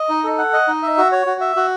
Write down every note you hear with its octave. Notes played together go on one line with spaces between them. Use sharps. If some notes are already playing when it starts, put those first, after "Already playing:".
Already playing: D#5
D#4
A4
F#5
D#5
D#4
E5
F#4
C#5
F#4
E5
F#4